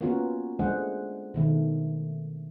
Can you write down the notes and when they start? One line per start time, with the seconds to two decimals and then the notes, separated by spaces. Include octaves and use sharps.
0.01 A#3 B3 C#4 F4 F#4 A#4
0.59 G#3 A3 D4 G#4 C5 F#5
1.34 B2 D#3 A3